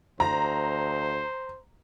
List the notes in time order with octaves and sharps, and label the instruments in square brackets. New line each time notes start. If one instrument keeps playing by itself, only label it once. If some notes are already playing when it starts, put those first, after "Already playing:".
[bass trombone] D2 [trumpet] C5 [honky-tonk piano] A#5